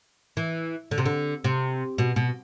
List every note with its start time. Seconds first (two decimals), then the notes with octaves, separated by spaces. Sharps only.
0.37 E3
0.91 D3
0.98 C3
1.05 D3
1.44 C3
1.98 B2
2.16 B2